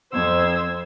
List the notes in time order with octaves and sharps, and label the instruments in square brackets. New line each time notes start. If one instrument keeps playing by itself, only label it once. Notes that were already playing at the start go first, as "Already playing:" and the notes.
[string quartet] F2 C5 E6 G#6